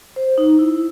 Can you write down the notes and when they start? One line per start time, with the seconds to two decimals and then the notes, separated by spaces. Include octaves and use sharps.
0.16 C5
0.38 D#4
0.59 E4